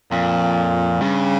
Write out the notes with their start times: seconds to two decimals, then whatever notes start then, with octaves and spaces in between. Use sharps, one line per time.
0.11 F2 A#2
1.01 G2 C#3